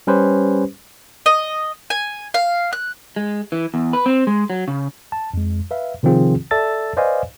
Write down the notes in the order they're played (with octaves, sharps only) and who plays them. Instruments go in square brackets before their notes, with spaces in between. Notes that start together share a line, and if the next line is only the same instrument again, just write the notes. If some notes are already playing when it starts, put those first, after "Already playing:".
[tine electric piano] G3 C#4 G4 B4 C5
[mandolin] D#5
G#5
F5
F#6
[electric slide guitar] G#3
E3
E2
B4
C4
G#3
F#3
C#3
[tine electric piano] A5
F2 G#3
B4 E5 F5
C3 D#3 F3 C4 F4 G#4
A4 D5 E5 A5 E6 A6
B4 C5 D5 D#5 F5 G#5